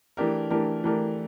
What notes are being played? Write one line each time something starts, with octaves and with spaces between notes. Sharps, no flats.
E3 A3 D4 G4 A#4
E3 A3 D4 G4 A#4
E3 A3 D4 G4 A#4